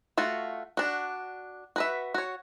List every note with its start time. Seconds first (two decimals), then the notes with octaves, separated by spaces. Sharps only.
0.18 A3 F4 F#4
0.77 D4 F#4
1.76 F#4 B4 E5
2.14 F#4 C#5